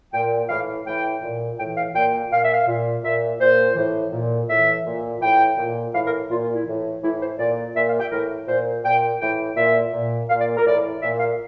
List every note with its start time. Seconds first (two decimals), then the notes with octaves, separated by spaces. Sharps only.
0.13 A#2 G5
0.49 A2 E3 F5
0.86 A2 E3 G5
1.22 A#2
1.58 A2 G5
1.62 E3
1.77 F5
1.95 A#2 G5
2.31 A#2 F5
2.43 E5
2.54 F5
2.68 A#2
3.04 A#2 E5
3.40 A#2 C5
3.76 A2 E3
4.12 A#2
4.49 A2 E3 E5
4.86 A#2
5.21 A2 E3 G5
5.58 A#2
5.94 A2 E3 F5
6.06 A#4
6.31 A#2 F4
6.42 F4
6.54 E4
6.66 A2 E3
7.02 A2 E3 E4
7.21 C5
7.39 A#2 D5
7.75 A#2 E5
7.88 F5
8.00 G5
8.11 A2 E3 A#4
8.47 A#2 C5
8.84 A#2 G5
9.21 A2 E3 G5
9.56 A#2 E5
9.93 A#2
10.29 A#2 F5
10.39 D5
10.57 A#4
10.65 A2 E3 D5
11.02 A#2 E5
11.19 F5